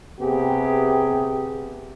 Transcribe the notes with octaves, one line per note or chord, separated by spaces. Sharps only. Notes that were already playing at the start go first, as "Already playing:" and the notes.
C3 B3 G4 G#4